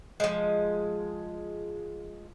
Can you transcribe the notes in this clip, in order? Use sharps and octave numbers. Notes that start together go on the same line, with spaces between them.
F3 G#3